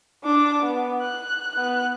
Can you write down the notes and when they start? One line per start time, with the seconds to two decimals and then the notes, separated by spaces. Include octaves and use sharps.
0.24 D4 D6
0.62 B3
1.02 F#6
1.52 B3 F#6